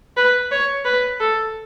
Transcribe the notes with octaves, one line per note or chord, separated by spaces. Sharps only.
B4
C#5
B4
A4